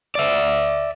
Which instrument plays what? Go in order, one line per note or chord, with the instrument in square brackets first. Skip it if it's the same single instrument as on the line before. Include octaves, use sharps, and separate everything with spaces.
[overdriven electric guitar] D5 E5